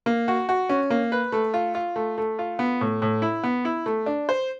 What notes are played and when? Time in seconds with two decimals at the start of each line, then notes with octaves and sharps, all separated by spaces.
0.06 A#3
0.28 F#4
0.49 F#4
0.69 C#4
0.90 A#3
1.12 B4
1.32 A3
1.54 F4
1.75 F4
1.96 A3
2.18 A3
2.39 F4
2.59 B3
2.81 A2
3.02 A2
3.22 E4
3.44 B3
3.65 E4
3.86 A3
4.06 D4
4.29 C5